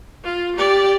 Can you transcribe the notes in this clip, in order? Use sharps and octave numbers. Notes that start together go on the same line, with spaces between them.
F4
G4 D5